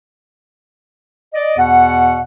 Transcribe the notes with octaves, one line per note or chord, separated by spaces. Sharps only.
D5 D#5
E2 B2 F#5